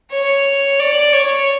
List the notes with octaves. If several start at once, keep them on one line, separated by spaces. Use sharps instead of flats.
C#5
D5
C#5